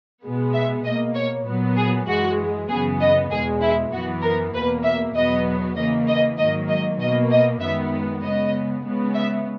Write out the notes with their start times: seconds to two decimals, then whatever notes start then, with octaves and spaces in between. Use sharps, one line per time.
0.23 B2 G#3 B3
0.53 E5
0.84 B2 A#3 D#5
1.15 C#5
1.46 A#2 F#3 B3
1.76 G#4
2.07 F#2 E3 G#3 F#4
2.68 F#2 C#3 E3 B3 G#4
3.00 D#5
3.31 E2 B2 G#3 G#4
3.61 E4
3.92 F#2 E3 B3 F#4
4.22 A#4
4.53 E2 B2 A#3 B4
4.84 E5
5.15 E2 B2 F#3 B3 D#5
5.76 C#3 E3 A#3 D#5
6.08 D#5
6.38 G#2 D#3 F#3 A#3 D#5
6.69 D#5
6.99 B2 A#3 D#5
7.31 D#5
7.61 F#2 D#3 G#3 B3 E5
8.22 C#3 G#3 B3 D#5
8.85 C#3 G#3 B3
9.15 E5